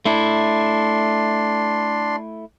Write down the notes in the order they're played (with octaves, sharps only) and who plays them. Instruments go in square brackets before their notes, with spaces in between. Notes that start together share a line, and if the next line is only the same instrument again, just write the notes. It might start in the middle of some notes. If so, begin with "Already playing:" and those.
[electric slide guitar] A3 E4 [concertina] D4 C6